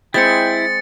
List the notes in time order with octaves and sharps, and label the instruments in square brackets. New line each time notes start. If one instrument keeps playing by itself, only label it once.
[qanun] G#3 C4 [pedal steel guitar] E4 [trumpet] G5 [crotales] A6 C#7